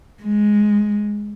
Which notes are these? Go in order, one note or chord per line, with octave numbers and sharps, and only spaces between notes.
G#3